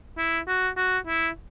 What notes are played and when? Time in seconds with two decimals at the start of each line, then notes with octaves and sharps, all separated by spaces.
0.18 E4
0.48 F#4
0.77 F#4
1.07 E4